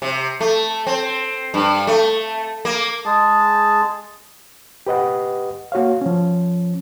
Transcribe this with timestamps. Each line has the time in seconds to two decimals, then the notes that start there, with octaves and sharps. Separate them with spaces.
0.02 C3
0.40 A3
0.87 C4
1.54 G2
1.87 A3
2.65 A#3
3.05 G#3 G#4 A5
4.87 G4 B4 D#5 F#5
5.72 A#3 F#4 C#5 F5
6.01 F3 C#4